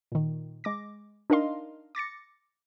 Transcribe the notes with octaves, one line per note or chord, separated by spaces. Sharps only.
A#2 D#3
G#3 D6 A#6
D4 D#4 A#4 D#5 F5 C6
D6 A6 A#6 C#7